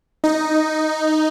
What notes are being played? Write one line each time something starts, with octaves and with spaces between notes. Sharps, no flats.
D#4